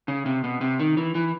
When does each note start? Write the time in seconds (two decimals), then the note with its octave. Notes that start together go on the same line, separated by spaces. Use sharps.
0.08 C#3
0.26 C3
0.44 B2
0.61 C3
0.79 D#3
0.97 E3
1.15 E3